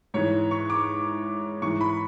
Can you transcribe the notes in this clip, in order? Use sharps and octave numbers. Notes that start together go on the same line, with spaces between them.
G#2 E3 C#5
C#6
D6
G#2 E3 C#6
B5